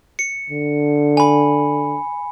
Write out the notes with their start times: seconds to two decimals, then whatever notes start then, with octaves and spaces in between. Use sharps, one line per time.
0.19 C#7
0.50 D3
1.17 G#5 B5